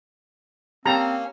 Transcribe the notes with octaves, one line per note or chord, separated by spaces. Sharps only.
A#3 C4 C#4 G4 A5 A#5